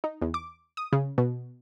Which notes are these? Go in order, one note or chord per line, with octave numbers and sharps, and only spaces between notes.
D#4
E2
D6
D#6
C#3
B2